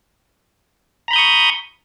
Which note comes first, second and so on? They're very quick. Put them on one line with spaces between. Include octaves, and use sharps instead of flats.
A#5 B5 G6 D#6 C#6